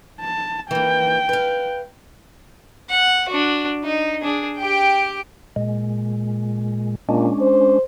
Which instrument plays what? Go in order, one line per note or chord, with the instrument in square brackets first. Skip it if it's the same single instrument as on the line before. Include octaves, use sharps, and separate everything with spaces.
[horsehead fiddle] A5
[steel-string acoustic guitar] E3 A#3 [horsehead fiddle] G5
[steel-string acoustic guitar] B4 F5
[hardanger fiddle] F#5
D4 F#4
D#4
D4 G#4
G4 G5
[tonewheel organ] A#2 G#3
[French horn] A#2 [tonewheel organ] G#3 C#4 D4
[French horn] C5